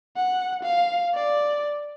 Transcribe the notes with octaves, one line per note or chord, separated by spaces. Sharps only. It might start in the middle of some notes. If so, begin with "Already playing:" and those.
F#5
F5
D5